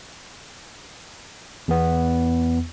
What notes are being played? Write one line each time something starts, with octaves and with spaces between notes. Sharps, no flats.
E2 B3